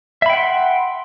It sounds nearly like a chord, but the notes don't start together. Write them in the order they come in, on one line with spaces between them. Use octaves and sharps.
E5 B5 G5 F#5 C6